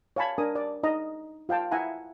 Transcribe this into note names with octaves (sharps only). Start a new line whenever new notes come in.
C#5 F5 G#5 A5 B5
D4 A#4 G#5 D#6
D5
D#4 D#5 A#5
F4 F5 G5 A5
E4 E5 F#5 G#5 A#5